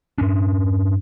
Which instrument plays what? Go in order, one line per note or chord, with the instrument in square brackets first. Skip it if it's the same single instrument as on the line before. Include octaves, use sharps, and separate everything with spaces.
[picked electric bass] G2 C#4 D4